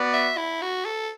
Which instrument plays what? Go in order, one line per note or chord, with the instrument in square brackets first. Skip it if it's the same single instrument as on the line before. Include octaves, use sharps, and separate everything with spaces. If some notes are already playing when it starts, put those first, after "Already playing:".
Already playing: [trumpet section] B3 F#4 D5
[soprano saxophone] E5
E4
F#4
A4